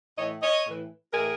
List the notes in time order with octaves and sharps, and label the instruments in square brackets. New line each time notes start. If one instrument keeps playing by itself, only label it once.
[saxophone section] A2 E3 C#5 D#5
C#5 D#5
A2 E3
A2 E3 G#4 A#4